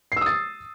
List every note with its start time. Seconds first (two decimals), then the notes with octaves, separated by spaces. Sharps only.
0.12 C7
0.16 E6
0.21 D#6
0.26 A6